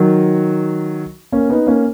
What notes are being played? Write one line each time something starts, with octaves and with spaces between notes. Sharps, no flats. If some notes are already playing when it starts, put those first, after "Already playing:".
Already playing: D#3 F#3
A#3 C#4
B3 D#4
A#3 C#4